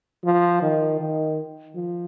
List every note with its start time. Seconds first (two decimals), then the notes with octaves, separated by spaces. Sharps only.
0.24 F3
0.62 D#3
1.00 D#3
1.76 F3